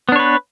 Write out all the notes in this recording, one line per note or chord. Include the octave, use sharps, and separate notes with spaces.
B3 D4 B4 C#5